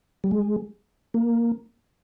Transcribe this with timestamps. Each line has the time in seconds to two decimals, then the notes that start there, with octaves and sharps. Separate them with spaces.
0.24 G3
0.31 G#3
1.14 A#3